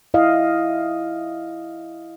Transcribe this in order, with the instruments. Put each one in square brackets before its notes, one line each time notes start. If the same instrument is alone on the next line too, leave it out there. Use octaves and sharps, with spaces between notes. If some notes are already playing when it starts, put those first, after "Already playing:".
[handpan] E4 D#5 F5